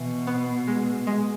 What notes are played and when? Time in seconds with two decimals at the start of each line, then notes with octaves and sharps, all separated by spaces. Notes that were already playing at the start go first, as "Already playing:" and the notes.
Already playing: B2 E3
0.27 B3
0.67 G#3
1.07 G#3